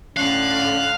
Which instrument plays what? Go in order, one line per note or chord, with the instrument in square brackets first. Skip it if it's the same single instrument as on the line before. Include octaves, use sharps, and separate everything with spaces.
[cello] A2 D3 [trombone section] C#4 [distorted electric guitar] F5 [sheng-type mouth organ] F#6